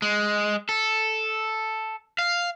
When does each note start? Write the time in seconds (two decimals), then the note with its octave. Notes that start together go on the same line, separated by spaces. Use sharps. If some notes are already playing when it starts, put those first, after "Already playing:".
0.02 G#3
0.69 A4
2.19 F5